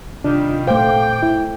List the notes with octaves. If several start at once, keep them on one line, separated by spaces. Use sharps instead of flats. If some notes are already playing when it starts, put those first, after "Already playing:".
C3 D#3 G3 D4 F4
A#2 A3 C5 F5 G5 D6
E4